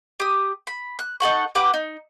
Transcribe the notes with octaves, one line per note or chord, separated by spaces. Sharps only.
G4 D#6
B5
F#6
D#4 A4 F#5 C#6
G4 B4 F#5 D6
D#4